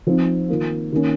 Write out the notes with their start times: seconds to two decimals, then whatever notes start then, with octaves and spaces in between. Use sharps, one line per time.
0.07 F3 C4 D#4
0.49 D#3 A#3 F4
0.92 D#3 A#3 C#4